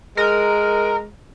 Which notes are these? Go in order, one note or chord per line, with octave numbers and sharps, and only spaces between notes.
G#3 A#4